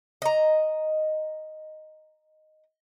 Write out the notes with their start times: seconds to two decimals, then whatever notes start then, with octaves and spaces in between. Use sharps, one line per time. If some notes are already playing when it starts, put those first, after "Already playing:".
0.22 D#5 A#5